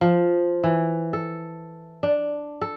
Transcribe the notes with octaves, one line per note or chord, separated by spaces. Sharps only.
F3
E3
A4
D4
A4